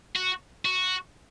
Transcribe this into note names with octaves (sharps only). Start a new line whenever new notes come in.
F#4
F#4